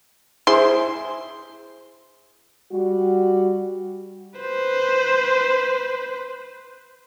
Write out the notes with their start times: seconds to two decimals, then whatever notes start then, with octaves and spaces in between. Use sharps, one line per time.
0.47 E4 G#4 C5 C6
2.71 G3 F#4
4.39 B4 C5